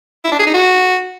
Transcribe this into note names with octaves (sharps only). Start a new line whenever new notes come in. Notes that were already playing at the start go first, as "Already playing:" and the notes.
E4
D4
G#4
D#4
F#4